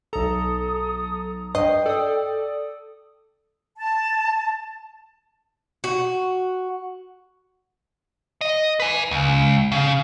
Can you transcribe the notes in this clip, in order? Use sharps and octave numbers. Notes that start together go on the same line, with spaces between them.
B1 A4 A#5 D#6
G2 D#5 G5 C7
A4 D5 D#6
A5
F#4
D#5
B4 G#5
C#2
C#3